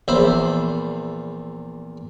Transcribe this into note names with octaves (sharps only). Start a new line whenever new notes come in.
A#1 E2 C5 E5 B5